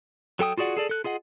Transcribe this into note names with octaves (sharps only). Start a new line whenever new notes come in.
F#3 A4 G5 D#6
F4 F#4 G#4 D5 F#5
G#4 A4 D5
A4 F#6
F4 G#4 D#5 F#5